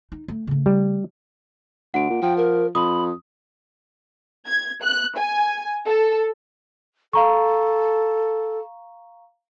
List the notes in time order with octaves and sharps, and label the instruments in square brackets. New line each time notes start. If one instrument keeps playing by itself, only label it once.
[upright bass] D#4
A3
C#3 A3
[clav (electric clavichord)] G3
[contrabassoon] D2 [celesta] F#5 D7
[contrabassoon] A#2
[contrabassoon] F3 [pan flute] G5
[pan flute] A#4
[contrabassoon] F2 [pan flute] B5 [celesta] D#6
[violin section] G#6
F#6
G#5
A4
[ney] A4 [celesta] F5 A#5 C#6